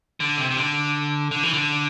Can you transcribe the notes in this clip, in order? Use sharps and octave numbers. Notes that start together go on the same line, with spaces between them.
D3
C3
C3
D3
D3
E3
D3